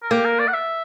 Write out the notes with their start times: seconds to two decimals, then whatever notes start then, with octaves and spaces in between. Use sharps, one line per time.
0.03 A#4
0.11 A#3 G4
0.25 A#4
0.39 D5
0.48 F#5
0.54 E5